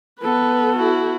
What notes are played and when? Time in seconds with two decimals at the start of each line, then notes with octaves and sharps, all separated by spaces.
0.21 B3 A4 B4
0.76 E4 F#4